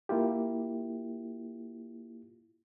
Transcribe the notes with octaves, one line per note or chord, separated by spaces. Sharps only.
A#3 E4 F4 G4